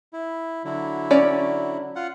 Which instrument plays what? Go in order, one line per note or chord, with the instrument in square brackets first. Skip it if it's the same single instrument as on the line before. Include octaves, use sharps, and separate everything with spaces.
[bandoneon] E4
D3 F#3 E4
[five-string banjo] C#4 C#5 D5
[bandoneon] F4 F#5